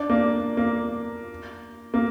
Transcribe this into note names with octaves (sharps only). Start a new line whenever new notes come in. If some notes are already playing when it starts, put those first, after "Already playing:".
Already playing: D4
A#3
A#3
A#3